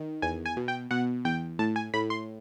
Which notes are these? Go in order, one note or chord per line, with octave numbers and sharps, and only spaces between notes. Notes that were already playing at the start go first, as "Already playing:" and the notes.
Already playing: D#3
E2 G#5
G#5
B2
G5
B2 F#5
E2 G5
A2 A5
G#5
A2 B5
C6